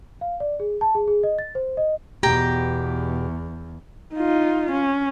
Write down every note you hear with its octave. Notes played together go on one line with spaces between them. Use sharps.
F5
D5
G#4
A5
G#4
G#4
D#5
A6
C5
D#5
E2 B2 G4 G5 A#5
D#4 F4
C#4